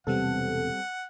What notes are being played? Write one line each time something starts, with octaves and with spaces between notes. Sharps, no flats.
E1 C3 G3 B3 C4 A4 F#5